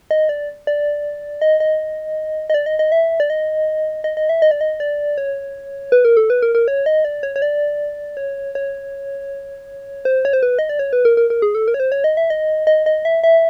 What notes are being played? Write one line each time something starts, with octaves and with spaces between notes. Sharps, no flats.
D#5
D5
D5
D#5
D#5
D#5
D5
D#5
D#5
E5
D5
D#5
D#5
D#5
E5
D#5
D5
D#5
D5
C#5
B4
A#4
A4
B4
A#4
A#4
C#5
D#5
D5
C#5
C#5
D5
C#5
C#5
C5
C#5
C5
B4
D#5
D5
C#5
B4
A#4
A#4
A#4
G#4
A4
A#4
C#5
C5
C#5
D#5
E5
D#5
D#5
D#5
E5
E5